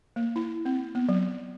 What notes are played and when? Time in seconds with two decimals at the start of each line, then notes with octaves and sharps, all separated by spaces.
0.16 A#3
0.36 E4
0.65 C4
0.95 B3
1.09 F#3